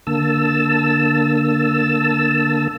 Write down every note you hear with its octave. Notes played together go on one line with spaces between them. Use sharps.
D3 A#3 A5 E6